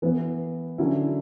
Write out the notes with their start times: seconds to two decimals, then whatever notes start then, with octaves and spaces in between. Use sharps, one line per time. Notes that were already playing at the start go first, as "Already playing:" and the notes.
0.02 E3 B3 E4
0.78 D3 F#3 C#4 E4